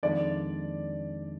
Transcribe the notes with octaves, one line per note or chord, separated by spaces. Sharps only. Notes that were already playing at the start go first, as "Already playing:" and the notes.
F2 D#3 G#3 D4 D5